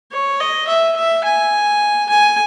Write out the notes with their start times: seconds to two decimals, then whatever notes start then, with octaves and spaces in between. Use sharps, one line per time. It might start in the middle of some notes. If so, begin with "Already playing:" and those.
0.12 C#5
0.40 D#5
0.68 E5
0.96 E5
1.24 G#5
2.09 G#5